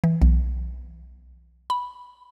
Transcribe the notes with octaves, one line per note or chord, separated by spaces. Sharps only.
E3
B1
B5